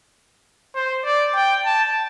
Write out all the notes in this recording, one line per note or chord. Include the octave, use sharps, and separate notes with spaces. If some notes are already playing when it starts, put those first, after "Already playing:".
C5
D5
G5
A5